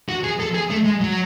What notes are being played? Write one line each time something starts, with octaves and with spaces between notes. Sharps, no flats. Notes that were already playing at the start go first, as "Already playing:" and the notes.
F#4
G#4
A4
G#4
A3
G#3
F#3